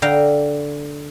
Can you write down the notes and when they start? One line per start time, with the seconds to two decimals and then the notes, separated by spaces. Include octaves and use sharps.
0.02 D3 F5 G5 A#5